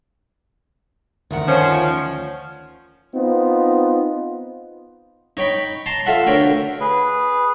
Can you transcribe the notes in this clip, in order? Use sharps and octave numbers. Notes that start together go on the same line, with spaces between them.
D2 D#3 F#5
F3 C#4
B3 C4 D#4 F4
D#4 C#5 G5 B5
A5 A#5 C6
F4 A4 E5 F#5
D2 A#4 C#5 G5
G#4 B4